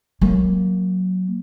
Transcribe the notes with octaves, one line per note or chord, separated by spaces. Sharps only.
F#3 A#3